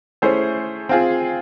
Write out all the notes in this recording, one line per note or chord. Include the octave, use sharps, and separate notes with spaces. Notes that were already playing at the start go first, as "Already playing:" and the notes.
A3 C#4 E4 G#4 C5
C4 F4 G#4